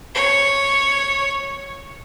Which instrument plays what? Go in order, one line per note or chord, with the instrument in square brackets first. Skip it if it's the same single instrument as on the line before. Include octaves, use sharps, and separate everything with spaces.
[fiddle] C#5